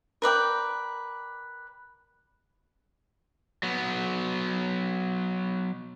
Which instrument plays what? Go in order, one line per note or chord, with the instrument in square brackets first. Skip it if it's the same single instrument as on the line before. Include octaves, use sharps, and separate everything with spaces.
[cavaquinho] A#4 B4 D5 G5
[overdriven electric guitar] F#3 B3